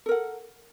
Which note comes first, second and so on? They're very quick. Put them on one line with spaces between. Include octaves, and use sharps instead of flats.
A4 A#4 F#5